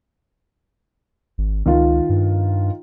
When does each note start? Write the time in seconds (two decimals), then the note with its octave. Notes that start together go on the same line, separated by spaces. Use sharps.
1.38 G#1
1.66 C#2 D#3 F4
2.09 G2